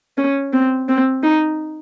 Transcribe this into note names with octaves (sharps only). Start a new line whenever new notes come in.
C#4
C4
C4
D#4